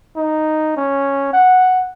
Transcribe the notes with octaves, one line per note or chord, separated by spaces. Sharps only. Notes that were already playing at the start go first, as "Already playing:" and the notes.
D#4
C#4
F#5